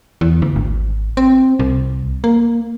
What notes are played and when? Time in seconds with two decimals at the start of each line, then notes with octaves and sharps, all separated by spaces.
0.21 E2
0.42 D2
0.56 G#1
1.17 C4
1.59 C2
2.24 A#3